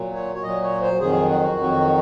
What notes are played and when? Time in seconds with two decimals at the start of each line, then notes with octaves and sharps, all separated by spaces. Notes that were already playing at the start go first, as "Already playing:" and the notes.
Already playing: A#2 F#3
0.15 C#5
0.34 C#5
0.43 A#2 F#3 D#5
0.63 C#5
0.81 C5
1.00 F2 D#3 F#3 G#4
1.29 F#4
1.58 F2 D#3 F#3